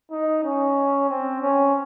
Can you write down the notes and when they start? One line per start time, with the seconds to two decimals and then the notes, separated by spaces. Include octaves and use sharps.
0.11 D#4
0.44 C#4
1.09 C4
1.41 C#4